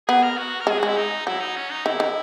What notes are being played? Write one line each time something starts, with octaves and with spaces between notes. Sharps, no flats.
B3 G#4
A#4
F#4
A#4
G#3
G#4
G#3 F#4
E4
D#4
F#3 E4
D#4
C#4
D#4
D#3 E4
D#3